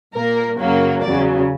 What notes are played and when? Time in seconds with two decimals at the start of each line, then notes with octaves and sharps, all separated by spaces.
0.13 A#2 A#3 A#4
0.58 F#2 C#3 F#3 A#3
1.01 E2 C#3 F#3 D5